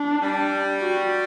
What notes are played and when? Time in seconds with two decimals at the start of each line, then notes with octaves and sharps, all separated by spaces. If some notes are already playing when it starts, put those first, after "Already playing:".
Already playing: D4
0.22 G3
0.81 F#4